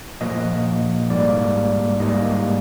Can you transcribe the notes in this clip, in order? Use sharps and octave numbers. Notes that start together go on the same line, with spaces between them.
A#2 F3 A#3 D#5
G#2 G3 A#3 D5
G#2 G3 A#3 D#5